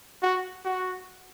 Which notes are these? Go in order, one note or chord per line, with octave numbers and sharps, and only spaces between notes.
F#4
F#4